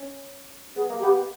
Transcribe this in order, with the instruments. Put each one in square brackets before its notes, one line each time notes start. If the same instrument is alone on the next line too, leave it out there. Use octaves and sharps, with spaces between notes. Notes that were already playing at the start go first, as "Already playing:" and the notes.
Already playing: [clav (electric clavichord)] C#4
[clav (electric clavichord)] B3 [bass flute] G#4
[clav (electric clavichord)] A#3
[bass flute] G4
[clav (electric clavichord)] B3